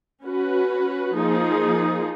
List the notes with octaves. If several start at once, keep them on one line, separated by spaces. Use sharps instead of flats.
C#4 F#4 B4
F3 A#3 D#4 G#4